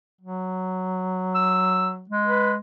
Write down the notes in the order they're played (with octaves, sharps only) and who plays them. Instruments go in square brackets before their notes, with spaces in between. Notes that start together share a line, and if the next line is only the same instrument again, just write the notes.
[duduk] F#3
[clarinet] E6
G#3
[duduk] B4